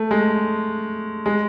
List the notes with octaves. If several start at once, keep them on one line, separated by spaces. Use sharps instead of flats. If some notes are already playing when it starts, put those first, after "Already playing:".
Already playing: A3
G#3
G#3